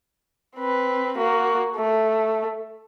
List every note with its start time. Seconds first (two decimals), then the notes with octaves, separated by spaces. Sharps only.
0.56 C4 B4
1.18 A#3 F#4
1.76 A3